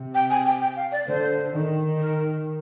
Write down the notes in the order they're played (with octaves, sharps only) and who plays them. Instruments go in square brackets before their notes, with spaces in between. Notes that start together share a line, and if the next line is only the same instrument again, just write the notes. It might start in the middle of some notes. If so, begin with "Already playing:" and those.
Already playing: [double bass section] C3
[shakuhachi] G5
G#5
G5
G5
F5
D5
[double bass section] D3 [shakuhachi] C5
[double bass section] D#3
[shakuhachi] A#4